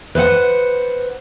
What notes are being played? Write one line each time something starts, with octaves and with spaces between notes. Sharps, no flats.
B4 C5 E5 F#5